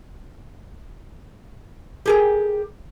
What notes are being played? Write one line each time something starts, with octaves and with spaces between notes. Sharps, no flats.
G4 G#4 A#4